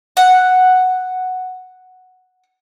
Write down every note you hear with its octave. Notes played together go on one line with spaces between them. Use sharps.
F#5